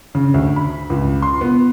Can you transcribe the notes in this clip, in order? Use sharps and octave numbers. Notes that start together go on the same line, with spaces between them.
C#3
D2
B5
C#2
C6
B3